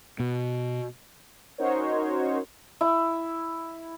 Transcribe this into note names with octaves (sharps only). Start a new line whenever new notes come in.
B2
C#4 D#4 F#4 A#4 C5 C#5
E4